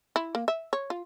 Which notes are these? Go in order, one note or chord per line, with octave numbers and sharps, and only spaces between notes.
E4
A#3
E5
C#5
F4